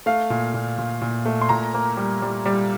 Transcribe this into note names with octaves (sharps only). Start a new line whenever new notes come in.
A3 F5
A#2
A#2
A#2
A#2
A3
C6
A#2 A#5
A#3
G3
G3
G3